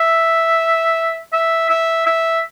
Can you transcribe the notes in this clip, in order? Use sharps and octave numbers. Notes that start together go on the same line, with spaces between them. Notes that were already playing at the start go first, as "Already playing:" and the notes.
Already playing: E5
E5
E5
E5